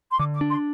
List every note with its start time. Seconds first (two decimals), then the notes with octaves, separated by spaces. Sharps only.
0.12 C6
0.19 D3 D6
0.35 D6
0.41 D4
0.51 C6